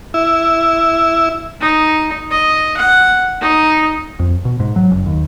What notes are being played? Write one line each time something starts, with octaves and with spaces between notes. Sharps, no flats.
E4
D#4
D#5
F#5
D#4
F2
B2
G#2
F#3
F#1
D#2